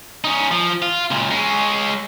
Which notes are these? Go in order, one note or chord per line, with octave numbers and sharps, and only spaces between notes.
C#4 D#4
F3
F4
C#2 A#2
G#3 C#4